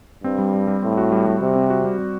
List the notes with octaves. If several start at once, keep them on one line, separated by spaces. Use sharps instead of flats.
G2 C4
G3
G3
G3
A2 C4
F#4
G3
G3
C3 G3
C4
F#4
G3
G3